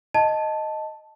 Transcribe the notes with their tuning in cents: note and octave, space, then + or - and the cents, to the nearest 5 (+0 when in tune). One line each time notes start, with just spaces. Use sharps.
D#5 +0 A5 +0